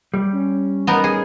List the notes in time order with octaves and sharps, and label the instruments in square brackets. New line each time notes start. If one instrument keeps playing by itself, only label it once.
[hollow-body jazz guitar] G3
[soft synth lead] C#4
[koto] B3 D#4 A#4
G#4